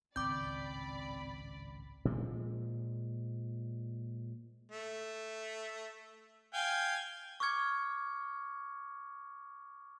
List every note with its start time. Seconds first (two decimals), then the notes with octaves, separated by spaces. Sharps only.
0.16 G#1 C#2 A2 C4 D5 B5 D6 G6
2.05 A#2 F3 G#3
4.71 A3
6.54 F5 G5 G#5
7.40 C#6 D6 F6 G#6 C#7